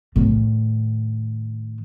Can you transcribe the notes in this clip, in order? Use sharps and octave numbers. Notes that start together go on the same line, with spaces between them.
A2 D#3